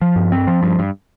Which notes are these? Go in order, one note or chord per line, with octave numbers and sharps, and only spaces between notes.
F3
G2
C4
F3
G2
G2